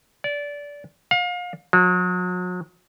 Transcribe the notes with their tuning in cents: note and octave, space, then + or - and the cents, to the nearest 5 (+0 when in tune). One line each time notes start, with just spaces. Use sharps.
D5 -20
F5 +35
F#3 -40